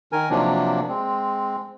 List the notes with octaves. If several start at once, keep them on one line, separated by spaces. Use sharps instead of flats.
D#3 A#4 G#5
C3 F3 F#3 A#3 D4
G#3 C4